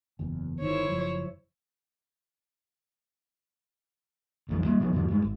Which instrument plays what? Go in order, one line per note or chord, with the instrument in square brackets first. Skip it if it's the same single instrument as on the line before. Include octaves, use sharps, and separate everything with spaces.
[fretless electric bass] F#1 E2
[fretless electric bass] G1 D#3 [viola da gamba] E4 C5 C#5
[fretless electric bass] F#1 F3
[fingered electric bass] A#1 F2 E3
G3 A#3
A#2 F3 B3
F2 A2 D#3 F3
G2 G#3
G#1